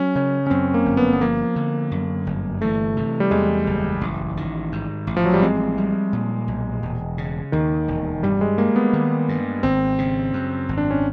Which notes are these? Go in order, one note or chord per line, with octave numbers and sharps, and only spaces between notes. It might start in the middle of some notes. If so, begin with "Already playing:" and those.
Already playing: F#3 C#4
C#3 C#4
C#4
F#2 C4
A#3
G1
B3
B3
F3 A#3
D3
F#2
G1
E3 A3
C3
G3
E2 G#3
F#1
A1
D#3
G#2
A1
F3
F#3
G3
G#3 C4
G3
A#2
B1
E1
C#3
D#2 D#3
E1
G2 G3
G#3
G#3 A#3
B3
D#3
G2
G#1 C4
C#3
F#2
G#1
D4
C#4